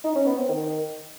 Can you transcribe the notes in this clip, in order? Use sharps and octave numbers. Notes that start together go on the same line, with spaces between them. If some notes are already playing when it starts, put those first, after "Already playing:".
D#4
C#4
B3
C4
D#3